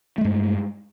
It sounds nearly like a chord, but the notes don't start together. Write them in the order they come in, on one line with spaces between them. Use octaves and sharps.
A3 G#3 G2